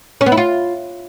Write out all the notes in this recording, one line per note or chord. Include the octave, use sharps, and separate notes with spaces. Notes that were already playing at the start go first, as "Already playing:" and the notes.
C#4
B3
E4
F4